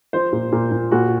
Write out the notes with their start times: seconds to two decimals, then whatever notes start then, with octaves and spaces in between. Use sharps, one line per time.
0.13 F3 C5
0.33 A#2
0.52 A#2
0.72 A#2
0.91 A#2 F#4